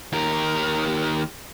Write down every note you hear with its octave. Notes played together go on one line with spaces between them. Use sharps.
D#2 A#4